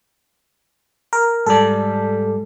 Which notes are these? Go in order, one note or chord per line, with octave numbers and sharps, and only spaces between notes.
A#4
G#2 G3 A4 D5